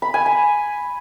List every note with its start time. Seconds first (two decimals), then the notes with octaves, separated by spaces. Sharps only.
0.02 B5
0.14 G#5
0.26 B5